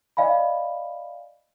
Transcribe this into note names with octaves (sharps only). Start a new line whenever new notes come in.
D5 D#5 F5 G#5 B5